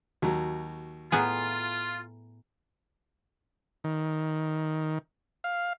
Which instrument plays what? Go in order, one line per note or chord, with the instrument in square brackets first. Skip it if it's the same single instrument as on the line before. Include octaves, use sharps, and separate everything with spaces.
[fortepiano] D#2 F#3 [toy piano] F#4
[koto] A2 B3 G#4 [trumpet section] F4 [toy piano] G#5 A#5 B5
[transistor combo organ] D#3
F5